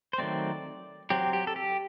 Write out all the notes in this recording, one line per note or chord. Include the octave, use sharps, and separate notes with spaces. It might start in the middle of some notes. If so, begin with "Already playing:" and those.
C5
D#3 F#3 A3 C4 D5
F#3 C4 G4
G4
A4
G4